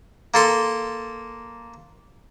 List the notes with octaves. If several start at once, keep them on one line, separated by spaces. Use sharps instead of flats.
A#3 A4 C6